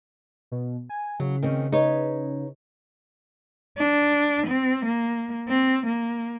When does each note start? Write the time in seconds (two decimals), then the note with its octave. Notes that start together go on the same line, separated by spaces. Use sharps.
0.51 B2
0.89 G#5
1.20 C#3 F#3
1.42 D#3 C4 C#4
1.72 D#4 B4 C#5
3.78 D4
4.47 C4
4.85 A#3
5.49 C4
5.86 A#3